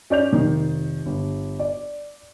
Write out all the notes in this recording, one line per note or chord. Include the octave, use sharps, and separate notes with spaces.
C#4 D5 G6 F7
F1 D#3
G1
D5